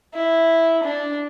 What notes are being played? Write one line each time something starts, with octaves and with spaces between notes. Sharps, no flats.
E4
D4